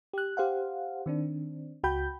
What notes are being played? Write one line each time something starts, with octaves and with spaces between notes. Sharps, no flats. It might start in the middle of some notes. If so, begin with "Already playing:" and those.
G4 F#6
G4 C5 F5 F#5
D#3 C4 D4
C#2 F#4 G5 B5 G6